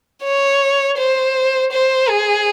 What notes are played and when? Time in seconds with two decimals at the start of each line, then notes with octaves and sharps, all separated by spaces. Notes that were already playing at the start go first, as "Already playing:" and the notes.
0.23 C#5
0.97 C5
1.72 C5
2.09 G#4